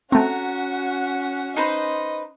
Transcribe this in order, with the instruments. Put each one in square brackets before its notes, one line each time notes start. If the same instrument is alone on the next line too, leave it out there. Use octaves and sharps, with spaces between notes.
[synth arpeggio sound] A3 C4 [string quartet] C#4 [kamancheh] F#4 F#5 [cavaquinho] A#5
[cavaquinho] D#4 B4 C5 [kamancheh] D#5